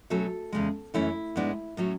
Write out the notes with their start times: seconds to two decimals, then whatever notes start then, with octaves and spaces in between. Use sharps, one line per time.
0.10 B2 F#3 A3 C#4 A4
0.52 E2 C#3 G#3
0.94 F#2 E3 A3 C#4 E4
1.36 G#2 G#3 B3 D4
1.77 A2 F#3 C#4